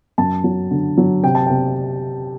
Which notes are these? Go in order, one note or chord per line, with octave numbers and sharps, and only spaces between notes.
F#2 A5
F#3
D3
F#3
C3 G5
A5
C3 G5